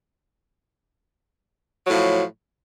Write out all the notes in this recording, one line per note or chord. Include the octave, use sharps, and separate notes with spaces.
A2 F3 F#3